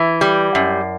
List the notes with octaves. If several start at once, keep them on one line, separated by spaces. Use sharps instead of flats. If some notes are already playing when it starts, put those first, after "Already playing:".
Already playing: E3
G3
F#2